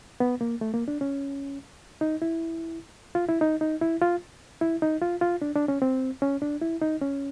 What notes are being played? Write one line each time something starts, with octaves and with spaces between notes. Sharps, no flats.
B3
A#3
A3
A#3
D4
C#4
D#4
E4
F4
E4
D#4
D#4
E4
F4
E4
D#4
F4
F4
D4
D4
C#4
C4
C#4
D4
E4
D#4
C#4